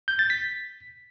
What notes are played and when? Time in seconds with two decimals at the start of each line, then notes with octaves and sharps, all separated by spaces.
0.08 G6
0.19 A6
0.30 B6